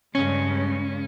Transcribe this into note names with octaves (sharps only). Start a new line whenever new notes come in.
G2 C#3 G#3 C#4